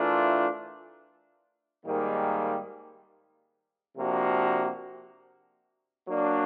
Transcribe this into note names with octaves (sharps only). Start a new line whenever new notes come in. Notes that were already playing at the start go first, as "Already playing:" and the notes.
Already playing: E3 A3 D4 F4 A#4
G#2 D#3 G3 A#3
C3 F3 A#3 D4 F#4
F#3 A#3 D4